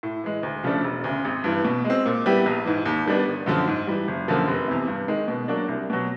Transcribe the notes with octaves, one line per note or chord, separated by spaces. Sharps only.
A2
E3 G#3
D2
C#3 F3 A3 D4
E1
D2 C#3
G#1
G2 E3
B2
G#3
C4
A#2
G3 B3 E4 G4
A#1
G#2 E3
D#2
D#3 G3 B3 D4
G1
F#2 D3 F3
G#2
E3 G3
F#1
F#2 D3 F3 A#3
F1
E2 C3
G2
D#3 G#3
B2
F#3 A#3 D4
C2
B2 F#3